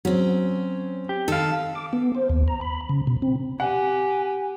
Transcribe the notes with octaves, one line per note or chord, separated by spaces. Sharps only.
F#3 C4 C#4
G4
D#3 A4 F5
D6
B3
C5
D#2
A#5
B5
C#3
B2
C4
G4 F#5 G#5